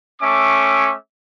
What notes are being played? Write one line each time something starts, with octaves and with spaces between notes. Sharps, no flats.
A3 C#4 E5 D6